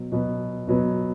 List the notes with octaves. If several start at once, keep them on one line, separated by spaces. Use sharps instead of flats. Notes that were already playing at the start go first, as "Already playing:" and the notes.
Already playing: B2 F#3 B3
B2 F#3 B3
B2 F#3 B3